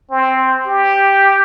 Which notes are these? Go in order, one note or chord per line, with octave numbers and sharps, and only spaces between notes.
C4
G4